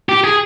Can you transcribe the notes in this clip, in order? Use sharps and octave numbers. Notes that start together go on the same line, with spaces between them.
G4
G#4